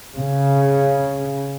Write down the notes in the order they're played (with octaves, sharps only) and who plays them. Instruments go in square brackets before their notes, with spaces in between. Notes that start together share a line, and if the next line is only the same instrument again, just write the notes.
[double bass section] C#3